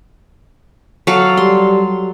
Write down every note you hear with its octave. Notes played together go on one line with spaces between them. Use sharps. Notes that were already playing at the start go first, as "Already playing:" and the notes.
F#3 A4 F5
G3 C6